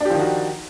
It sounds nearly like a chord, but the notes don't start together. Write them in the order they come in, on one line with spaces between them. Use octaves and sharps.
D4 G4 F3 D#3 F#4